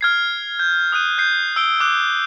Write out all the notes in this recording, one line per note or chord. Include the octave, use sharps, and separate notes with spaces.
F6 G#6 C7
G6
D#6 F6 F#6 D#7
G6 C7
E6 D7 G7
D6 F#6